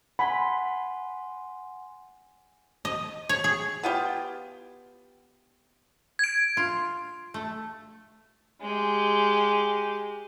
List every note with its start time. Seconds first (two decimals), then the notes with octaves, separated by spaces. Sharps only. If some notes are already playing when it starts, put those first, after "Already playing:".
0.19 F#5 G#5 B5 C6
2.85 D#5
3.29 C#5
3.44 G#4
3.83 B3 F4 G4
6.19 G#6 D7
6.57 F4
7.34 A3
8.61 G#3 G4